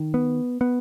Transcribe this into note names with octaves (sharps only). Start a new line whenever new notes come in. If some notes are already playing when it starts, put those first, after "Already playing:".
Already playing: D#3
B3
B3